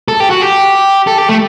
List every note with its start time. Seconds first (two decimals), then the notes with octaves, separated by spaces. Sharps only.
0.08 A4
0.20 G4
0.30 F#4
0.42 G4
1.07 A4
1.18 G4
1.29 A3